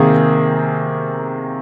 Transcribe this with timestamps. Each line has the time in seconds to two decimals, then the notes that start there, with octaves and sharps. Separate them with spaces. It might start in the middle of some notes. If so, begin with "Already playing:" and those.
Already playing: C3 D#3 A#3 G#4